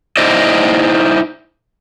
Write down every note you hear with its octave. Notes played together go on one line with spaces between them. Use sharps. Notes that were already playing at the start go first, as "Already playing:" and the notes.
D#4 E4 C5 D5 D#5